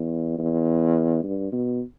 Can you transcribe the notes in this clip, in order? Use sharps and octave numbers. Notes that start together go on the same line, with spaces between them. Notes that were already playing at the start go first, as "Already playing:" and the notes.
Already playing: E2
E2
G2
B2